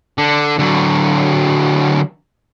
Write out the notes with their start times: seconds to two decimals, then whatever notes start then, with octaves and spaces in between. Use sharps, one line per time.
0.18 D3
0.59 D3 F#3